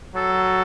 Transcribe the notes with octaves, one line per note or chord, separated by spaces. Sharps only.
F#3 A4